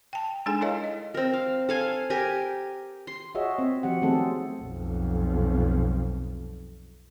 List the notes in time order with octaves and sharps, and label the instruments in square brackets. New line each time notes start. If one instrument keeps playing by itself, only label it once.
[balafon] G5 A5
G#3 D4 D#4 G#4 A4 G#5
E4 A4 A#4 C#5 D#5 F5
D#5
[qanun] C4 A#4
F5
A4 F5 G#5
G4 A#4 G#5
C6
[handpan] F4 F#4 G#4 C#5 D#5 E5
C4
F3 F#3 G4 F#5
D#3 A3 B3 C4 G#4 A4
[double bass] B1 F2